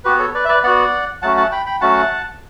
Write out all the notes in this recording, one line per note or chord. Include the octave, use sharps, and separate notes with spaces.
B3 F#4 G4 B4
A4 C#5
B4 D5
E5
B4 D5
B3 F#4 D5 F#5
F#3 A3 C#4 F#4 F#5 A5
F#5 A5
G5 B5
G5 B5
F#3 A3 C#4 F#4 F#5 A5